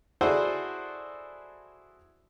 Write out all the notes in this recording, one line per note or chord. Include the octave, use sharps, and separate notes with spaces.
E4 F#4 G#4 A4 C5 D5